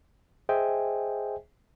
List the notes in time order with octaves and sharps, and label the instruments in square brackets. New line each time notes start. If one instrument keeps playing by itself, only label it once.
[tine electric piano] G#4 C5 D#5 E5 G5 G#5